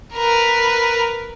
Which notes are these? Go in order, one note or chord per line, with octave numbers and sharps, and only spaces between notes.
A#4 B4